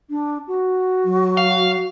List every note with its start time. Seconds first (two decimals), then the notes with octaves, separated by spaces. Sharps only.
0.09 D4
0.47 F#4
1.05 F#3
1.37 F5